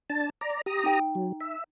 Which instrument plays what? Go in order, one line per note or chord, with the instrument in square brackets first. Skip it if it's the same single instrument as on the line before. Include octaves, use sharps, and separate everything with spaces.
[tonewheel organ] D4 A5
D5 A#5
G4 A#5 D#6
[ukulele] D#4 G5
[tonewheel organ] F#3
E5